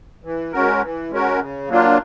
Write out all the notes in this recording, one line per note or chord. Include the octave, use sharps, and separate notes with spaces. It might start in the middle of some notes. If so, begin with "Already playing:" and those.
E3
G#3 C#4 F#4 A#4
E3
G#3 C#4 F#4 A#4
C#3
F#3 A#3 D4 F4